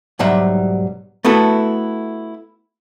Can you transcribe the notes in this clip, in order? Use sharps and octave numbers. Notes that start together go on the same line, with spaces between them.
B1 G#2 F#3 G3 E5
A3 B3 E4 F#4 A4